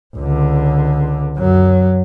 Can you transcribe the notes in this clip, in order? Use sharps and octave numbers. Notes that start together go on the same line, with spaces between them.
C#2 D3
F#2 F#3